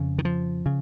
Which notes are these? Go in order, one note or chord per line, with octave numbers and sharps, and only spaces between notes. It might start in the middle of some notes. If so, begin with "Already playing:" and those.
Already playing: F2 C#3
D#3
F3
C#3